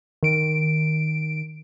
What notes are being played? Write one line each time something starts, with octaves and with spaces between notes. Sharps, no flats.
D#3 D7